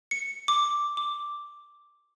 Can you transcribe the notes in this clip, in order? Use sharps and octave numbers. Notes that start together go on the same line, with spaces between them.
C#7
D6
D6